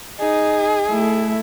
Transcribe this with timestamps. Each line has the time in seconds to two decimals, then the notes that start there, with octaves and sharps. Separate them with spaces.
0.20 D#4 G#4
0.89 A3 E4